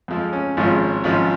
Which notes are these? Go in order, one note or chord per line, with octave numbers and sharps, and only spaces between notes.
F2 F3 G#3
C#4
G#1 G#2 F3 G#3 C#4 F4
G#1 G#2 F3 C#4 F4